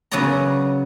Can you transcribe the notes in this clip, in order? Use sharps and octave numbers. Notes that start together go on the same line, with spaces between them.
C#3 F#3 B3 C#5 D5 A#5